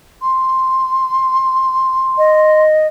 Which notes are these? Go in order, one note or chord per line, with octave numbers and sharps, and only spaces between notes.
C6
D#5